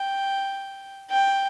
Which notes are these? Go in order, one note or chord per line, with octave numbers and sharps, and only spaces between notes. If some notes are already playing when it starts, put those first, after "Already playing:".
Already playing: G5
G5